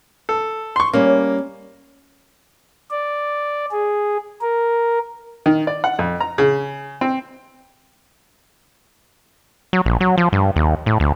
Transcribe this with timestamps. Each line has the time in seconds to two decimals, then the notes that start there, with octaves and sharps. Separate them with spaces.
0.29 A4
0.76 C6 C#6
0.93 G3 A#3 C#4
2.91 D5
3.71 G#4
4.41 A#4
5.46 D#3
5.67 D5
5.84 F#5
5.99 F2
6.20 A#5
6.38 C#3
7.01 C4
9.73 F#3
9.86 A#1
10.01 F#3
10.18 F3
10.33 G2
10.56 D#2
10.86 A2
11.00 D2